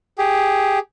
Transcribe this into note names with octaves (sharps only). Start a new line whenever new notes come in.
G4 G#4